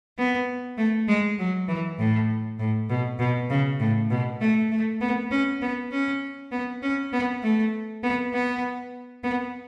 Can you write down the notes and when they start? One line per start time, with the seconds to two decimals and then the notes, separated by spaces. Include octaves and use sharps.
0.18 B3
0.77 A3
1.08 G#3
1.39 F#3
1.68 E3
1.99 A2
2.59 A2
2.89 B2
3.19 B2
3.50 C#3
3.80 A2
4.10 B2
4.41 A3
4.71 A3
5.01 B3
5.31 C#4
5.62 B3
5.92 C#4
6.52 B3
6.83 C#4
7.13 B3
7.43 A3
8.03 B3
8.33 B3
9.24 B3